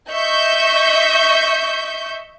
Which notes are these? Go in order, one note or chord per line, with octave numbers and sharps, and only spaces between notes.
D#5 E5 C#6 G6